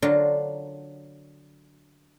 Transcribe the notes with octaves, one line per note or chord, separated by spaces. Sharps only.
D3 F#3 D4 F4 A#4